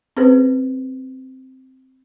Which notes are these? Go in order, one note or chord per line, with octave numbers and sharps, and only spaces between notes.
C4 C#4 G#4 B4 C5